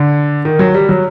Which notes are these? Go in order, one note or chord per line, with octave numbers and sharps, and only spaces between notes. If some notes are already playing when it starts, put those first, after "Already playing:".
Already playing: D3
D#3
F#3
G3
F#3